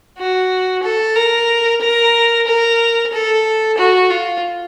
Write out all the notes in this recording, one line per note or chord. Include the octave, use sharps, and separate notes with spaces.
F#4
A4
A#4
A#4
A#4
A4
F#4
F4